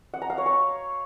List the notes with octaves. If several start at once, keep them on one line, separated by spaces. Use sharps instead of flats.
F#5
A#5
F5
C#5
C#6